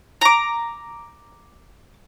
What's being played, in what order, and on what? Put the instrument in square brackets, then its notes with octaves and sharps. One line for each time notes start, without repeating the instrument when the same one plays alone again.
[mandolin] A#5 D6